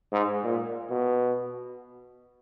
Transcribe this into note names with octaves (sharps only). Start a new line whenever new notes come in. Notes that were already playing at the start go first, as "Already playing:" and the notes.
G#2
A#2
B2